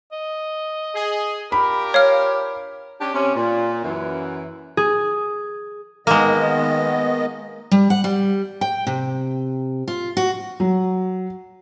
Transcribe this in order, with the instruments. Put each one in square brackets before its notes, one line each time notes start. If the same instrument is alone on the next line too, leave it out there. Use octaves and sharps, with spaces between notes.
[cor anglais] D#5
[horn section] G#4
[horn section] D4 F4 A#4 [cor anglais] G4 [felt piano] B5
[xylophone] C#5 F5 F6
[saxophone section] C#4 D4 G4
C3 C#4
A#2
F#2 E3
[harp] G#4
[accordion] D#3 B3 D#5 [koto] G#3 A#3
[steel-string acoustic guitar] G3
F#5
G3
G5
C3
F4
F#4
[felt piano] F#3